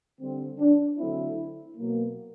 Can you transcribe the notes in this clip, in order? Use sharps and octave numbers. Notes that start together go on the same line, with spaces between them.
D3 G3 C4
D4
D3 F#3 A3 C4 E4
B2 F#3 A#3